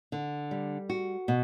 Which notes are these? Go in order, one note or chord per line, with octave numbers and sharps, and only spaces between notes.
D3
G3
F#4
B2